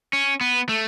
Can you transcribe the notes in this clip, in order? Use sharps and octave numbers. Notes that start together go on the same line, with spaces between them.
C#4
B3
A3